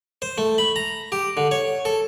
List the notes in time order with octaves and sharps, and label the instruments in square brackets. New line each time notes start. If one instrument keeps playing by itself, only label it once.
[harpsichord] C5
A3
B5
A#5
G4
D3
C#5
A4